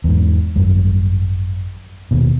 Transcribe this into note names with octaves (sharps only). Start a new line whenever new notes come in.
E2 G#2
G#1 F#2 G3
D#2 B2